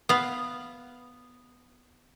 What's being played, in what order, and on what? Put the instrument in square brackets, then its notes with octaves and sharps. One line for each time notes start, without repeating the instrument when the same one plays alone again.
[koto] B3 F5